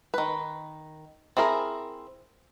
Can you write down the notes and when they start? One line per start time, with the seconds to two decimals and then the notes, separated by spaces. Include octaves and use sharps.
0.14 D#3 B4
1.37 C4 E4 G#4 A#4